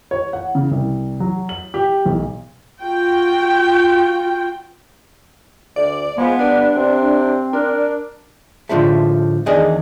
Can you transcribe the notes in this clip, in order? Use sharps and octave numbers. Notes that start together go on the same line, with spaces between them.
C#5
F#5
C#3
C2
F#3
F#7
G4
B1
F4 F#4 G5
D2 D5
F3 G#3 B3
G2 D4
C3 C4
D4 A#4
A2 D3 F3 G#3 A3
E2 D#3 D4 G#4 D#5